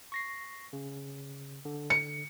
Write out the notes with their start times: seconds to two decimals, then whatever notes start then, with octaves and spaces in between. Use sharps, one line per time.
0.12 C#6 A#6 C7
0.73 C#3
1.65 D3
1.90 C#7